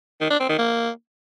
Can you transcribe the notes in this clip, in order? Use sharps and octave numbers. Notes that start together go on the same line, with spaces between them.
D#3
D4
C4
D#3
A#3